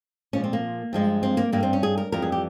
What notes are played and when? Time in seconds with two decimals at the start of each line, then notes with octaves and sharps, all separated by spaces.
0.33 A#2 F3 G#3 C#4
0.44 C4
0.53 A#3
0.93 G2 F3 G#3
1.23 C4
1.37 A#3
1.52 G2 G3 A#3
1.63 C4
1.73 C#4
1.83 G#4
1.97 A#4
2.12 F2 E3 G3 A#4
2.22 G#4
2.32 G4